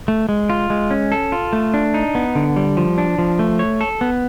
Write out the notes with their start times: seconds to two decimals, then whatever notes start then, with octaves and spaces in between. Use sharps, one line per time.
0.08 A3
0.29 G#3
0.50 F4
0.70 G#3
0.91 C#4
1.12 A4
1.32 F4
1.53 A3
1.74 D4
1.94 D#4
2.15 B3
2.35 D3
2.56 G3
2.77 F3
2.98 D4
3.18 F3
3.39 A3
3.59 C#5
3.81 A4
4.01 B3